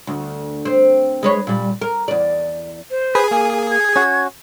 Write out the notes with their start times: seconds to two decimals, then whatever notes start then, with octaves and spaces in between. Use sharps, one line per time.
0.07 D2
0.65 C4
1.23 G#3 B4 C#5
1.47 A#2 G3
1.82 A#4
2.08 E2 D5
2.91 C5
3.15 G#4 B4
3.31 A#3 G#5
3.71 G#6
3.96 C#4 F#4